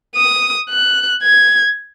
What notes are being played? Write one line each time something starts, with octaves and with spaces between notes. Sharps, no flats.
D#6
F#6
G#6